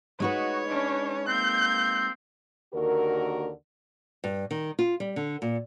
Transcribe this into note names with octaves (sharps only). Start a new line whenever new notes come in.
G#3 D#4 F#4 B4 C#5
C#4 D4
A#3 C4 G6
D#2 D3 F#4 A#4
G2
D#3
F4
G3
D3
A#2